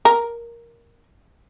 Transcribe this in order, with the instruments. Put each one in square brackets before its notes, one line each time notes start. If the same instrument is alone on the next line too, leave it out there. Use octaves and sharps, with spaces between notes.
[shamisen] A#4